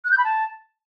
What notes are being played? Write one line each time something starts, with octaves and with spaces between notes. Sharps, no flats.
F#6
G6
B5
A5